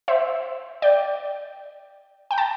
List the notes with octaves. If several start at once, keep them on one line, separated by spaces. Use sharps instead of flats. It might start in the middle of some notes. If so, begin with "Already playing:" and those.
C5 E5
D5 G5
G5
A5